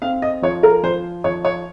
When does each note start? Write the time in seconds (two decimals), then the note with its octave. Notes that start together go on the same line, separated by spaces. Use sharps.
0.02 C4 F5
0.22 D#5
0.42 F3 C#5
0.63 A#4
0.83 F3 C5
1.24 F3 C#5
1.45 C#5